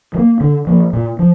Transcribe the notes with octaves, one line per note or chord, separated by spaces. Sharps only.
F3
A#3
D3
F3 A#3
A#2
F3